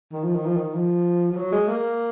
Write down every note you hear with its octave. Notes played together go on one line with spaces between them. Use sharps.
D#3
F3
D#3
F3
D#3
F3
F3
F#3
G#3
A#3